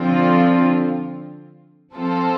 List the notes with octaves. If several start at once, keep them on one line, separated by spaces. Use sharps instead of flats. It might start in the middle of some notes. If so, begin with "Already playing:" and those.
Already playing: D3 F3 C4 F4
F3 C4 F4 A4 C5